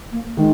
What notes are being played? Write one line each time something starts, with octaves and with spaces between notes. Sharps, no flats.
A#3
D#3 G#3